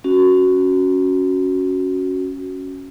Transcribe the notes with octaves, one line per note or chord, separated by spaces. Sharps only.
C#4 F#4